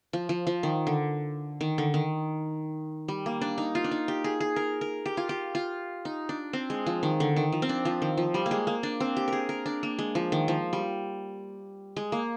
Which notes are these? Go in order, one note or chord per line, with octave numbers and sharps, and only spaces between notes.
F3
F3
F3
D#3
D3
D#3
D3
D#3
G3
A#3
D4
D#4
F4
D4
D#4
G4
G#4
G#4
A#4
A#4
G4
F4
G4
F4
D#4
D4
C4
G#3
F3
D#3
D3
D#3
F3
C4
D4
F3
D#3
F3
G3
A#3
G#3
A#3
D4
C4
G4
G#4 A#4
A#4
D4
A#3
G#3
F3
D#3
F3
G3
G#3
A#3